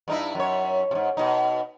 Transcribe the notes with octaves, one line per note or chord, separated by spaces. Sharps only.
G2 D#4 E4
F#2 C#5
G#2 C3
B2 D#4